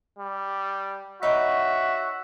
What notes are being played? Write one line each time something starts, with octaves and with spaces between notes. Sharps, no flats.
G3
D#4 F#4 C#5 E5 B5